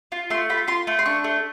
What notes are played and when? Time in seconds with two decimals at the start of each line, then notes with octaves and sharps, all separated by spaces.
0.12 F4
0.30 A3 C6
0.49 F4 B5
0.67 F4 C6
0.87 A3
0.99 C6
1.06 D4 C#6
1.24 A3